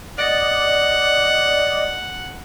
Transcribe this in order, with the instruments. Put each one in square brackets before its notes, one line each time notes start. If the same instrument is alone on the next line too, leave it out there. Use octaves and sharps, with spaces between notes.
[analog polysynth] D5 D#5 [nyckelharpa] F#5